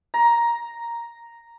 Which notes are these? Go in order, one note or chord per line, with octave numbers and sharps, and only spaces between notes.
A#5